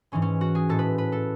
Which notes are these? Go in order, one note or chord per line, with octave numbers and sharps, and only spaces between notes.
G#2 E3 G#3 C#4
C#4
F#4
G#4
A2 G#3 A4
B4
B4
A4